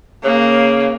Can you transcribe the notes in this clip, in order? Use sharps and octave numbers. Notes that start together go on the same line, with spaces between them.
C#3 A#3